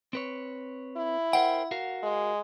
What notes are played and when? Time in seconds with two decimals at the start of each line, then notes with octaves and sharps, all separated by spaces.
0.13 C4 B4 C#5
0.97 E4
1.33 A#4 C5 F#5 G5
1.71 F#4 A#4 F5
2.03 G#3